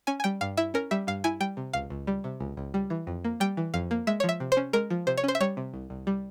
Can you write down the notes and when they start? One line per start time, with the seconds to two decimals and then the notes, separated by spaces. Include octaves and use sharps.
0.07 C#4 G#5
0.20 G#5
0.24 G3 G5
0.41 G2 F5
0.57 E4 E5
0.74 C#4 A#4
0.91 G3 E5
1.07 G2 F5
1.24 E4 G#5
1.40 G3 G5
1.57 C3
1.73 C#2 F5
1.90 C#2
2.07 G3
2.24 C3
2.41 C#2
2.57 C#2
2.74 G3
2.90 E3
3.07 F2
3.24 A#3
3.40 G3 G5
3.57 E3
3.74 F2 F5
3.91 A#3
4.07 G#3 E5
4.20 F3 C#5
4.29 E5
4.40 C3
4.52 C5
4.57 C#4
4.73 G#3 A#4
4.90 F3
5.07 C3 C5
5.18 C#5
5.24 C#4 C5
5.35 E5
5.41 G3 C#5
5.57 C3
5.74 C2
5.90 C2
6.07 G3